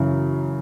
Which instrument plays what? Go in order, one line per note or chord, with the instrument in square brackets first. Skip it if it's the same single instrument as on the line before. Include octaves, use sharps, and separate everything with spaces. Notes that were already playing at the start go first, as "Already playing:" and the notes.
Already playing: [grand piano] F#2 C#3 E3